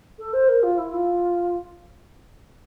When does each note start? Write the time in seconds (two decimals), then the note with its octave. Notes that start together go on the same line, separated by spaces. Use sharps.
0.19 A4
0.33 C5
0.49 A#4
0.63 F4
0.78 E4
0.93 F4